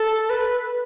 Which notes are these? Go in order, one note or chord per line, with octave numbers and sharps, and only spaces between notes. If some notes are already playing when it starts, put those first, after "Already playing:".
Already playing: A4
B4